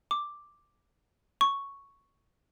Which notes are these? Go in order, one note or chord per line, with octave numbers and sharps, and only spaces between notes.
D6
C#6